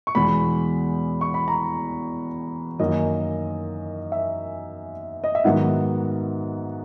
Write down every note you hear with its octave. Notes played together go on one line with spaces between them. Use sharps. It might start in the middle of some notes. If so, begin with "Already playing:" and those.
C#6
E2 B2 G#3 B5
C#6
B5
A#5
F#2 D#3 A#3 C#4 D#5
E5
D#5
E5
G#2 D#3 F#3 B3 F#5